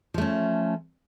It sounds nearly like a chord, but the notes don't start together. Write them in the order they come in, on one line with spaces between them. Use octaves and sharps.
F3 A3 C#4